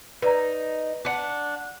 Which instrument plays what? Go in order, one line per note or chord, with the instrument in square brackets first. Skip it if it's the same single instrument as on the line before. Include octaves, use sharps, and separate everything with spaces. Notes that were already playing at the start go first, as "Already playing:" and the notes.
[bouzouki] D#4 [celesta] B4 D5 A#5
[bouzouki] D4 F#5